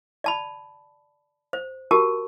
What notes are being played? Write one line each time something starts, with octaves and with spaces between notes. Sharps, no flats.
D5 A5 B5
C5
F#4 G4 A#4 A5